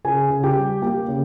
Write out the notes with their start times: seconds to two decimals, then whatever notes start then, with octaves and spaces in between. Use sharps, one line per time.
0.04 C#3 G#4 G#5
0.30 C#3
0.43 G4 G5
0.56 G3
0.82 A#3 G4 G5
1.08 C#3